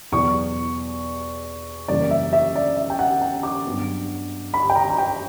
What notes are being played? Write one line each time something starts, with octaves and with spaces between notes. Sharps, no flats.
E2 B2 F#3 C#6
F#2 C#3 E3 G3 A#3 D5
E5
E5
D5
E5
G5
F#5
G5
D6
G2 F#3 B3
B5
G5
A#5
A#5
G5